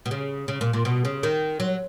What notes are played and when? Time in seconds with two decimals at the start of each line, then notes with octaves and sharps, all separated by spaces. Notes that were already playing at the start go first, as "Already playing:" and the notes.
0.06 B2
0.11 C#3
0.48 C#3
0.61 A#2
0.73 A#2
0.85 B2
1.05 C#3
1.23 D#3
1.60 F#3